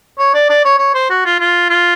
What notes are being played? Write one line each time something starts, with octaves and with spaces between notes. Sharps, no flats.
C#5
D5
D5
C#5
C#5
C5
F#4
F4
F4
F4